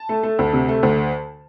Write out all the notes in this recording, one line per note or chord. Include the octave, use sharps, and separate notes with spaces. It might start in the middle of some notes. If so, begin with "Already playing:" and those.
Already playing: A5
A3
A3
D2
C3
A3
D2